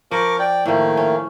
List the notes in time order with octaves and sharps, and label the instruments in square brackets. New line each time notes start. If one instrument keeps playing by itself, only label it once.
[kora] F3 [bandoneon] A#4 C#6 D6
[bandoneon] D5 G5
[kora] A2 F3 [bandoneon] D#3 A3 A#3
[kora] C#4